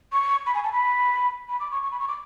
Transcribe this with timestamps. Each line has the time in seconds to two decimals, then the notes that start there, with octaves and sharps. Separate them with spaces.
0.12 C#6
0.46 B5
0.54 G#5
0.64 A5
0.72 B5
1.49 B5
1.60 D6
1.71 C#6
1.83 C#6
1.92 B5
2.00 C#6
2.08 D6